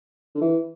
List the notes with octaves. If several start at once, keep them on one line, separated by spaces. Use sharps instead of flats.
D3
E3